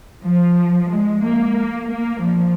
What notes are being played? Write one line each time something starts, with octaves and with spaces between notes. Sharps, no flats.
F3
G#3
A#3
A#3
F3